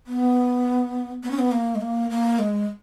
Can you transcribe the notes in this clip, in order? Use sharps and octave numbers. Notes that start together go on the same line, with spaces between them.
B3
B3
C#4
B3
A#3
G#3
A#3
A#3
G#3